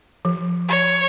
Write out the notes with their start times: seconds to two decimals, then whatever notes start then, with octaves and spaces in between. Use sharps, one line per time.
0.25 F3
0.68 C#5